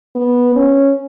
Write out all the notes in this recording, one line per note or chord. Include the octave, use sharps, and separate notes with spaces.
B3
C#4